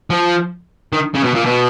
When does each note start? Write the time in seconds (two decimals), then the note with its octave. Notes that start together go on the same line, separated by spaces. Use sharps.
0.10 F3
0.93 D#3
1.14 C#3
1.24 B2
1.34 A#2
1.45 B2